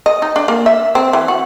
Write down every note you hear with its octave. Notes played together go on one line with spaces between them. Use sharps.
D#5
D#4
D4
A#3
E5
C4
E3
F#4